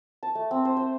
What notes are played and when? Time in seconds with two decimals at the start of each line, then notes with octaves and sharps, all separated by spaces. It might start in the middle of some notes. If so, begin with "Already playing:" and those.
0.23 A5
0.35 A3
0.51 C4
0.65 C5
0.77 C5